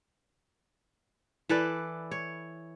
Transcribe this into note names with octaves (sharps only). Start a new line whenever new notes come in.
E3 A4 B4 D5
C#5